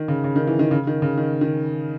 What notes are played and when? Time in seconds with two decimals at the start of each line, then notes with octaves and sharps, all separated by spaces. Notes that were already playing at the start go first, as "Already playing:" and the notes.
Already playing: D#3
0.08 C#3
0.24 C#3
0.36 D#3
0.47 E3
0.59 D#3
0.71 C#3
0.87 D#3
1.02 C#3
1.18 D#3
1.41 D#3